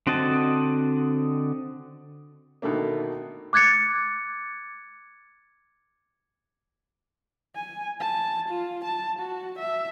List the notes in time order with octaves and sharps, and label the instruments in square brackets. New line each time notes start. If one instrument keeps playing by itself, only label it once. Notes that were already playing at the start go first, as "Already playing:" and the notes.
[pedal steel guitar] D3 C4 F#4 D#5 A5
[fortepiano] B2 D3 D#3 A3 A#3
[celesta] D6 F#6 G#6 A6 C#7
[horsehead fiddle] G#5
A5
F4
A5
F#4
E5